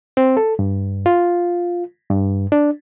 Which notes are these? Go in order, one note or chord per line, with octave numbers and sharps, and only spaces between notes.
C4
A4
G2
F4
G2
D4